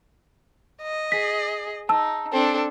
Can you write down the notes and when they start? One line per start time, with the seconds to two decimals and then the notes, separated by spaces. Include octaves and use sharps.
0.82 D#5
1.12 G#4 B6
1.89 D#4 A5 E6
2.33 C4 D4 A4